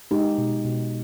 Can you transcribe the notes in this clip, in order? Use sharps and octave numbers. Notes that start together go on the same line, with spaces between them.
G#3 D#4 G4
B2
B2